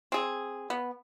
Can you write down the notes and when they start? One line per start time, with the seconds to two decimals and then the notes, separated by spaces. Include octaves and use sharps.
0.12 C4 G#4
0.70 B3